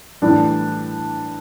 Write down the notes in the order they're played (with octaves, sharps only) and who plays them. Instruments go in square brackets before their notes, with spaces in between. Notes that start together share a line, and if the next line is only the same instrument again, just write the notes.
[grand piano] A2 E3 G3 D4